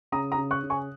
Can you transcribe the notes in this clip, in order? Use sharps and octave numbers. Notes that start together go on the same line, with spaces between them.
C#3 A#5 D#6
A#5 D#6
C#3
C#6 F#6
C#3
G#5 C#6